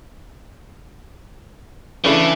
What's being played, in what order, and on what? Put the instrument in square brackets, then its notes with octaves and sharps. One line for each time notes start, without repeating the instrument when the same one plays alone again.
[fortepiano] C#3 A3 D4 [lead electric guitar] E3 E4